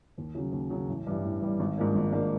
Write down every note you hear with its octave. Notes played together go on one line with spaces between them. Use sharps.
D#2
C#3 F#3
D#2
C#3 F#3
A1
G2 E3 G3
A1
G2 E3 G3
G#1
G#2 F3 A#3 D4
G#1
G#2 F3 A#3 D4